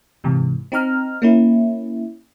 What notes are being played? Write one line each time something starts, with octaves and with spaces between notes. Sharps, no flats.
G#2 C3 E3
C4 D#4 A#5 F6
A#3 C#4 E4